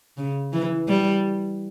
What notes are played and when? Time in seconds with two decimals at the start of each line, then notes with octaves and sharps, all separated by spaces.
0.17 C#3
0.53 E3
0.88 G3